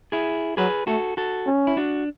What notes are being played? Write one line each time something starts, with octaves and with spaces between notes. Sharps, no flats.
E4 G#4
F#3 G#4 B4
A3 F#4 A4
F#4 A4
C#4
E4
D4 F#4